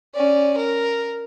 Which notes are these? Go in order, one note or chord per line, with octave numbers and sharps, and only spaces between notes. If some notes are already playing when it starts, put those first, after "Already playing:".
C#4 D5
A#4